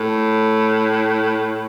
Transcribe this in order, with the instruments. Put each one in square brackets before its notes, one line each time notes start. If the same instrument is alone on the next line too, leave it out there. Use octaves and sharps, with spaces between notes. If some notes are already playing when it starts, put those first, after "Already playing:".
Already playing: [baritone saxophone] A2